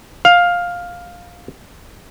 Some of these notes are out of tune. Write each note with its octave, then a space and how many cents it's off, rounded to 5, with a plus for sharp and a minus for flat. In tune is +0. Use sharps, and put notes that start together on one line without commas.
F5 +10